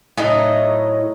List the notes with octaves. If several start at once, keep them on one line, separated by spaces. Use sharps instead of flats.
A2 F#3 D#4 D#5